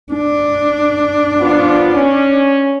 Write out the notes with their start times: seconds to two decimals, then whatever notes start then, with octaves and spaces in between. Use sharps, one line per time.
0.13 D4
1.39 F3 B3 F4
1.93 C#4